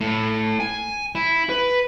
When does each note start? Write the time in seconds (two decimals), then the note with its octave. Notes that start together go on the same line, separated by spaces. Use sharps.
0.01 A2
0.60 G#5
1.15 E4
1.49 B4